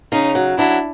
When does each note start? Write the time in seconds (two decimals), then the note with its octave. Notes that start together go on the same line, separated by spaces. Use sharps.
0.11 C#3 C#4 D#4
0.35 F#3
0.58 F#3 D4 E4